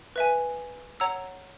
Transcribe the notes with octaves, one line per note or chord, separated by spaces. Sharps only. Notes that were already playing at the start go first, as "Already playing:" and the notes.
B4 E5 G#5
C#5 F#5 A#5 E6